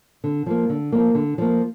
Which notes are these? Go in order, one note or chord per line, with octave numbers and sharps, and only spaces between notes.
D3
F3 A#3
D3
F3 A#3
D3
F3 A#3